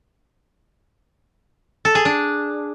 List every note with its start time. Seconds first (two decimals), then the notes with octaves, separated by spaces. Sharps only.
1.85 A4
1.95 G#4
2.05 D4